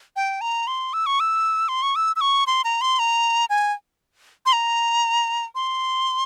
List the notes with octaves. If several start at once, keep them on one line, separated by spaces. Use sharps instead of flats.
G5
A#5
C6
E6
C#6
E6
C6
C#6
E6
E6
C#6
C6
A#5
C6
A#5
G#5
C6
A#5
C6